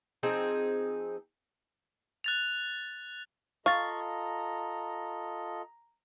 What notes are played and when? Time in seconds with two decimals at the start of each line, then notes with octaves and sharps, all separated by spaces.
0.23 F3 C4 D#4 G#4
2.24 F#6 A6 F7
3.66 F4 A4 D#5 F5 A#5 C#6 A6